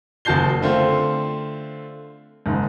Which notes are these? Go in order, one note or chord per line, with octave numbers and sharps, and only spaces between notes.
F#1 F#4 A5 G6 C7 G7
D3 A3 C4 F4
F#1 G#2